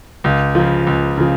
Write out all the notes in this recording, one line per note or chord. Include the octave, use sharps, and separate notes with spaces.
C#2
C#3 F3
C#2
C#3 F3